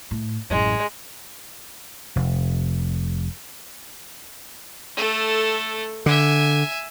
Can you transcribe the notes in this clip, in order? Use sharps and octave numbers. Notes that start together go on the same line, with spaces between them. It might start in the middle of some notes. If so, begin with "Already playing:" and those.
A2
A1 F#2 G#3
F1
A3 A4
D3 E5 G#5